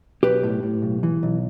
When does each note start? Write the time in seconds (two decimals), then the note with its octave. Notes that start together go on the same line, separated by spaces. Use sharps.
0.23 B1 G4 B4
0.43 A2
0.63 A2
0.82 B1
1.03 E3
1.23 B1